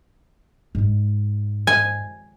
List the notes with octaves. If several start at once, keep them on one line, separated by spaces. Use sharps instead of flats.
G#2 G#3
G#5